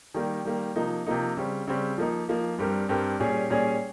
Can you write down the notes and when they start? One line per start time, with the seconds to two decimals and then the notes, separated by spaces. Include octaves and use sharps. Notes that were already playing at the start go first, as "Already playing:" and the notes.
0.14 D#3 G3 A#3
0.45 D#3 G3 A#3
0.76 C3 F3 A#3 D#4
1.06 C3 F3 A#3 D#4
1.37 C#3 G3 C4
1.68 C#3 G3 C4
1.98 F3 A#3 D#4
2.28 F3 A#3 D#4
2.58 G2 G3 C4 G4 A#4
2.89 G2 G3 C4 G4 A#4
3.20 A#2 G3 C#4 G#4
3.50 A#2 G3 C#4 G#4